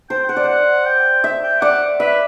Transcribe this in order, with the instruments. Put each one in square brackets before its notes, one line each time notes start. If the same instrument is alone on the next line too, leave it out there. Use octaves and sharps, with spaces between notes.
[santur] C5 [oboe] G5
[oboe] G5
[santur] C5 [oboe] F#5
[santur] D5
[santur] C5 [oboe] F#5
[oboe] G5
[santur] E5
[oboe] G5
[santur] D5 [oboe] F#5
[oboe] B4 [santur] E5